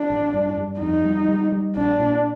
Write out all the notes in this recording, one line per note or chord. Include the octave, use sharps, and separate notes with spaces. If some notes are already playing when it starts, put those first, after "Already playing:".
Already playing: D4
A1
G2
G2
F2 D#4
G3
G3
G3
A#1 D4
A#2